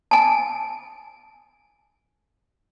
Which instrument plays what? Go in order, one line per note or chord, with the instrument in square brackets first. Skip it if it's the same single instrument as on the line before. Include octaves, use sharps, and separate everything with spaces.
[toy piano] G#5 A5